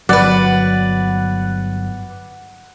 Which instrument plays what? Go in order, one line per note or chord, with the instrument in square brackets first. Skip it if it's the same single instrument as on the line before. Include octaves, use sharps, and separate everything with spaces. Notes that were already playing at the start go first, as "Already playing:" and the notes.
[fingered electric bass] G1 F#3 [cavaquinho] B4 D5 [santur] F#5